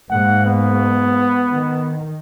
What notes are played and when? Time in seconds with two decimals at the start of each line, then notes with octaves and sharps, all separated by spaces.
0.10 G#2 A#3 F#5
0.45 B3
1.49 D#3